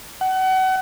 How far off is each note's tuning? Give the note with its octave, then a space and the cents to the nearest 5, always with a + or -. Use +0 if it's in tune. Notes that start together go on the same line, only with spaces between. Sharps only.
F#5 +30